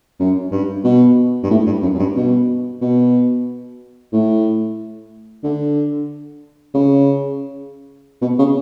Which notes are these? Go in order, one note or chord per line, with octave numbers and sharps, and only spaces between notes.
F#2
G2
B2
G2
A2
G2
F#2
F#2
G2
B2
B2
A2
D3
C#3
B2
C#3